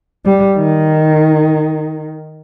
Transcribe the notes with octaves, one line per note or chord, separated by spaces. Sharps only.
G3
D#3